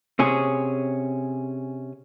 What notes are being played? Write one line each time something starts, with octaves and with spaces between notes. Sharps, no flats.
C3 C#4 G#4